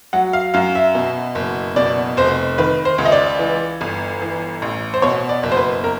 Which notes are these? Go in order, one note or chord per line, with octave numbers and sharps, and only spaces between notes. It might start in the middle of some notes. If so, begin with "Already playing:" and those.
F#3 F#5
F5
F#2 F5
E5
B2
F#1
B2 D5
F1 C5
D#3 B4
C5
C#2
D#5
D5
E3
G1
E3
A1
C5
B2 C#5
D5
F#1
C5
B4
A#4